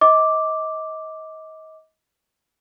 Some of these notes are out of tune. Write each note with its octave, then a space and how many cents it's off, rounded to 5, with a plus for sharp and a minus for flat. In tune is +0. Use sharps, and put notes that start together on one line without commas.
D#5 +30 D6 +0